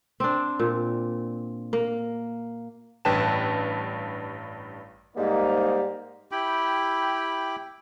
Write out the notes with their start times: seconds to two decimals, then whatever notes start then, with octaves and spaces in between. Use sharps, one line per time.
0.20 C4 D4
0.59 A#2
1.73 A#3
3.05 A1 G2 B4 G5 A5 E7
5.17 G#2 G3 A#3 D#4
6.32 E4 G4 G5 B5